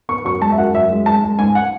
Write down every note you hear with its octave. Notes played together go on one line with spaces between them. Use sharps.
B3 C#6
F#2 C#6
G#3 A5
E5
F#2 F#5
F#2 E5
G#3
G#3 A5
G#3
G#2 G#5
F#5